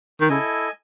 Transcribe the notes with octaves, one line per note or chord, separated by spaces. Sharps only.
D#3
C#3 E4 A4 D#5 G#5